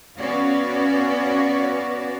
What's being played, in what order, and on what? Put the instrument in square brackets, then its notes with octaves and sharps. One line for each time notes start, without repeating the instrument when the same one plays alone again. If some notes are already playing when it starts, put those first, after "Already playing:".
[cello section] B3 C#4 F#4 C#5 D5 F5